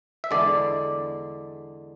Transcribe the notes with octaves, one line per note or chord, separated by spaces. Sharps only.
E5
E2 D3 G#3 D5